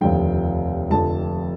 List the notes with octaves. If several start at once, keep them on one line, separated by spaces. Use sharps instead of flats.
F1 D#2 D3 F3 G5
F1 F2 D3 A5